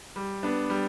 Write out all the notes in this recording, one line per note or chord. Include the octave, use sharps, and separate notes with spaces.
G3
B3 D4
G3